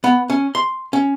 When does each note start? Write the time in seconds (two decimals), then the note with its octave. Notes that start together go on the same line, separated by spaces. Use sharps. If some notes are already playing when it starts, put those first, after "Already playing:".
0.04 B3
0.30 C#4
0.55 C6
0.93 C#4